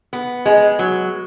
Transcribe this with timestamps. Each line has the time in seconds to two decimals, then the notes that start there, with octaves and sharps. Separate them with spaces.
0.13 B3
0.46 G#3
0.79 F#3